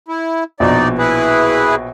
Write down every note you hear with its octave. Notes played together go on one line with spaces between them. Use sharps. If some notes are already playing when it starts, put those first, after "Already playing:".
E4
A#1 B2 D#4 D5
E4 G#4 B4